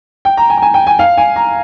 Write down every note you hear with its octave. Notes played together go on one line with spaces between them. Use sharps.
G5
A#5
G#5
A#5
G#5
G5
G#5
F5
G#5
A#5